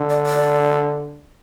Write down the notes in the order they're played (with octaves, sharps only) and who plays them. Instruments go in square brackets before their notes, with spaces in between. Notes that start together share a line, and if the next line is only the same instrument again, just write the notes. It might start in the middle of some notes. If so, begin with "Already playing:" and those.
Already playing: [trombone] D3
[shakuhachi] D5
D5